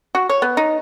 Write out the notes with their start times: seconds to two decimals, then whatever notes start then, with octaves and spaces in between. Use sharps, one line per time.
0.15 F#4
0.29 C#5
0.42 B3
0.57 D#4